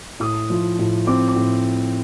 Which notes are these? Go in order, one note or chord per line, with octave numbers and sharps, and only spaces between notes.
A2 D#6
F3
A2
C4 D6
D6
A2